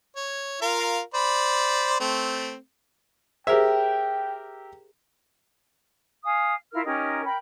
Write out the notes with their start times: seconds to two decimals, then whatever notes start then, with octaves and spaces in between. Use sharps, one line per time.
0.16 C#5
0.62 F4 A#4 F5
1.14 C5 D5 B5
2.00 A3 C4
3.47 G4 G#4 A#4 C5 E5 G5
6.23 F5 G#5 D#6
6.71 E4 F4 A#4 F6
6.84 C#4 D#4 G4 A#4
7.23 A#4 G5 B5